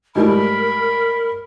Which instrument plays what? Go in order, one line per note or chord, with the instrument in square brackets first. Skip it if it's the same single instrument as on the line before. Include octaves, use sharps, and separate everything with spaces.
[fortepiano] G#2 G3 A3 [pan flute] A#4 [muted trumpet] B5